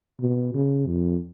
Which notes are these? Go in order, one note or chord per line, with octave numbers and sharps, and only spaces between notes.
B2
C#3
F2